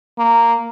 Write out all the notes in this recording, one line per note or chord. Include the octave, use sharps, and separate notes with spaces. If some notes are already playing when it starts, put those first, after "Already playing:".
A#3